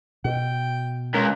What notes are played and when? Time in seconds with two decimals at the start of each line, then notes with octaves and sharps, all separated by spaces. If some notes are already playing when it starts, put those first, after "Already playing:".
0.25 B2 G5
1.14 C#2 A#4